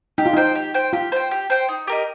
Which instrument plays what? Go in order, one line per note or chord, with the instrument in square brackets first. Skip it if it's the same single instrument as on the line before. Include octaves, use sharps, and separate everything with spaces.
[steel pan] D#4 [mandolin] G4
[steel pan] F4
[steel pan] D#4 [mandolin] C5 G5
[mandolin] G4
C5 G5
[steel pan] F4 [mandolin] G4
[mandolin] C5 G5
G4
C5 G5
D#4
G4 A#4 D#5